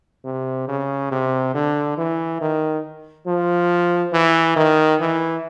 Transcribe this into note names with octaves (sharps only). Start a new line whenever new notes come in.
C3
C#3
C3
D3
E3
D#3
F3
E3
D#3
E3